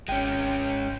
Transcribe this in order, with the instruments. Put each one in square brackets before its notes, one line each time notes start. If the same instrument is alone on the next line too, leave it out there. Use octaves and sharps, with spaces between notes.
[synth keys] G#1 G5 [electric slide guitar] G#3 C#4